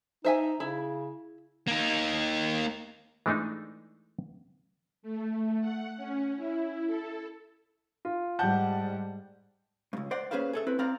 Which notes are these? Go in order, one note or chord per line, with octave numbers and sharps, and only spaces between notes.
D#4 C5 E5 G#5
C#3 E4
A#3 D#4
E3 G#3 A3 D4 D#4
A3
F#5
C#4
E4
A4
F4
G#2 G3 F#5 A5 G6
C#2 G2
C5 D5 F#5
A#3 C#4 G#4 B4 C5 F5
G#4 A4 E5
C4 E4 B4
C4 D5 F5 A#5